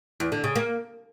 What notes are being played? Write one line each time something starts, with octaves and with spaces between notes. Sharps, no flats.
E2
D3
C#3
A#3